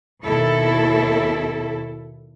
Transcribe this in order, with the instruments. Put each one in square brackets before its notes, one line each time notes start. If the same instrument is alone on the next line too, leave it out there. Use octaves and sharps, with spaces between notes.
[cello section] D#2 B2 E4 A4